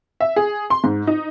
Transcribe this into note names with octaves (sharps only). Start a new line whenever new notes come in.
E5
G#4
C6
G#2
D#4